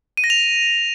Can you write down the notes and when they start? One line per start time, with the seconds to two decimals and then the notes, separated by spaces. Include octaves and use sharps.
0.17 D#7
0.24 A#6
0.30 F7